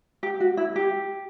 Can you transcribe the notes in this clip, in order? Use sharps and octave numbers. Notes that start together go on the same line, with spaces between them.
G4
F#4
E4
G4